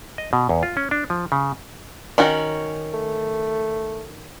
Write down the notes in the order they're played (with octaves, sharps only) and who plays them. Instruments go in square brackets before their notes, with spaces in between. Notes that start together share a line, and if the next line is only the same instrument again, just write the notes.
[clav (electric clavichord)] D#5
B2
E2
F4
C#4
D4
F3
C#3
[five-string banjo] D#3 C#4 F#4
[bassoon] A3